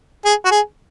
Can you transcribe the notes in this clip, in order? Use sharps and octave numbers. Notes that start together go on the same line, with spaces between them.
G#4
F#4
G#4